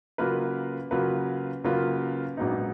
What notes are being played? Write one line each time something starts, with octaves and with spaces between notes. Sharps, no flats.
C#3 F#3 A#3 F4 B4
C#3 F#3 A#3 F4 B4
C#3 F#3 A#3 F4 B4
A#1 G#2 F#3 B3 D#4